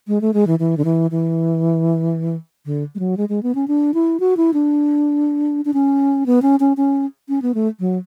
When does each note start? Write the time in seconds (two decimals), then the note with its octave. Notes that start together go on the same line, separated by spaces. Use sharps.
0.08 G#3
0.21 A3
0.34 G#3
0.47 E3
0.59 E3
0.77 D3
0.85 E3
1.11 E3
2.65 D3
2.95 G#3
2.99 F#3
3.17 G#3
3.29 G#3
3.43 B3
3.55 C#4
3.68 D4
3.94 E4
4.20 F#4
4.37 E4
4.53 D4
5.65 D4
5.74 C#4
6.26 B3
6.42 C#4
6.60 C#4
6.77 C#4
7.29 C#4
7.42 B3
7.54 A3
7.80 F#3